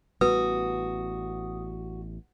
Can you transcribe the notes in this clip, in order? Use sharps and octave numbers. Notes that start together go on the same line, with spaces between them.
A1 G3 B3 F#4 B4 D#6